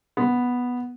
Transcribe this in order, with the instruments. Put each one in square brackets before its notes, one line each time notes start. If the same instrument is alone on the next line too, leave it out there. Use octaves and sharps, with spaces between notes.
[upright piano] B3